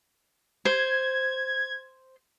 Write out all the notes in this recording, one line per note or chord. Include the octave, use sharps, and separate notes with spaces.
C5 G#6